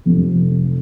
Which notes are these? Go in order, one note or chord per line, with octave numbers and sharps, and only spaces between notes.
F1 F2 C3